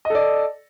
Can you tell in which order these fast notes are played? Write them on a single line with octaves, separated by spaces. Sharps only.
D#5 A4 D5